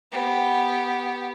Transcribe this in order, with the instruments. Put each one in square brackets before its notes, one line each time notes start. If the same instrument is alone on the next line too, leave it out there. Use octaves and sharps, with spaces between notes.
[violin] B3 G4